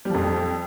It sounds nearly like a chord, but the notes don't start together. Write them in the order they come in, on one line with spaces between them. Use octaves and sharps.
G3 F3 F2